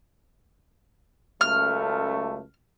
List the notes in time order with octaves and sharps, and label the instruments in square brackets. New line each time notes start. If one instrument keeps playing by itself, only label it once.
[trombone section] C#2 F#2 A3 [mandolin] F6